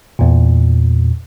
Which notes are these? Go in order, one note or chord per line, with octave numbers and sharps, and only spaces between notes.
E2 A#2